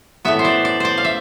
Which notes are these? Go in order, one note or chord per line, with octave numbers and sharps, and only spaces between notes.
A2 E3 B3 E5
C5
D5
D5
C5 D5
F5
E5